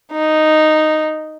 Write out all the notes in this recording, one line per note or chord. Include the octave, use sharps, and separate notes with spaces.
D#4